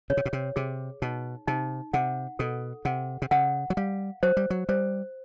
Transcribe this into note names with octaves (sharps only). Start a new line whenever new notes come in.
C#3 C#5
C3
B2
C3
C3 G#4
B2 D#4
C3 D#4
C3 F#5
B2 A4
C3 F#5
C3
C#3 F#5
F#3
G3 F5
F#3 C5
G3
F#3
G3 C5